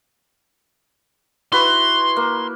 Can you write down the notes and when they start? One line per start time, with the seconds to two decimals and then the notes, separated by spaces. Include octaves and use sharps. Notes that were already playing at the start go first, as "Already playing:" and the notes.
1.52 E4 F#4 B4 C6
2.16 A#3